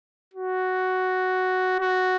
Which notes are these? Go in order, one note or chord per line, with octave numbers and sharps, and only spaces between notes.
F#4
F#4